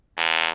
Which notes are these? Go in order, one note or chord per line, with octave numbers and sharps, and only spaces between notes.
E2